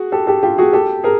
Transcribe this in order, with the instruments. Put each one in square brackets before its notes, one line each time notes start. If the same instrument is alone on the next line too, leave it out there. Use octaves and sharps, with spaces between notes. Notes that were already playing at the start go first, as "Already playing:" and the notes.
Already playing: [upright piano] F#4 G#4
G4 A4
G4 A4
F4 G4
F#4 G#4
G4 A4
G#4 A#4